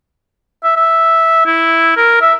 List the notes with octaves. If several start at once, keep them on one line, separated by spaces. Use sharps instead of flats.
E5
E5
E4
A#4
E5